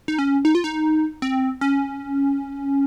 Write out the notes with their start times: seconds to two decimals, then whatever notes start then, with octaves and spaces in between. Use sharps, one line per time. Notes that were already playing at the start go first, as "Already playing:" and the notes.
0.08 D#4
0.19 C#4
0.45 D#4
0.55 F4
0.64 D#4
1.22 C4
1.61 C#4